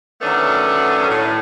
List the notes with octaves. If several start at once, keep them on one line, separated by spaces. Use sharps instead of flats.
D#3 F#3 A3 B3 C#4 D4
A2